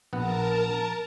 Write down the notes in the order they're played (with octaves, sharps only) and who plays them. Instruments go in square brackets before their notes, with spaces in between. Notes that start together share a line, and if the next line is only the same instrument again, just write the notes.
[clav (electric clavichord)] A#1 B3 F#5 [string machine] A#4 A5 A#5